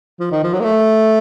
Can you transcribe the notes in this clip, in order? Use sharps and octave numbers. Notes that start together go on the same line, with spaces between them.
F3
D#3
F3
F#3
A#3
A3